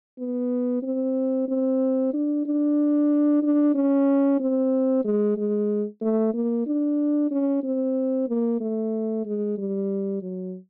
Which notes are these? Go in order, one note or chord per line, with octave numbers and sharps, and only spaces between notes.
B3
C4
C4
D4
D4
D4
C#4
C4
G#3
G#3
A3
A#3
D4
C#4
C4
A#3
A3
G#3
G3
F#3